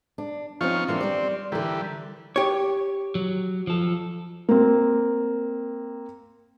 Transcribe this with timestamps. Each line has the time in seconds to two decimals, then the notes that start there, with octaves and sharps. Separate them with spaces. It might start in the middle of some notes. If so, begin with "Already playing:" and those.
0.18 D4
0.61 F3 C4 C#4 D#4 F4 C#6
0.88 E3 A#3 C4 D4
1.00 G3 D5
1.52 D3 E3 G3 A#4
2.36 G4 C#5
3.15 F#3
3.67 F3 A4
4.49 A#3 C4